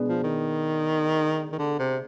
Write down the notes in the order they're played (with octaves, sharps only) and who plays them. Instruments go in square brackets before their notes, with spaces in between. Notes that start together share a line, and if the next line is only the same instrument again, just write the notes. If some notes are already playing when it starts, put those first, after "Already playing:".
Already playing: [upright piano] B2 G#3 B3 D4
[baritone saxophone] F3
D#3
D#3
D3
C3